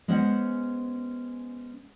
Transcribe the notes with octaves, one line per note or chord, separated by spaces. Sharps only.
G#3 B3 C#4 C5 F#5